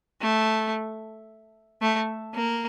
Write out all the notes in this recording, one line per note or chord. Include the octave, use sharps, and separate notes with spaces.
A3
A3
A#3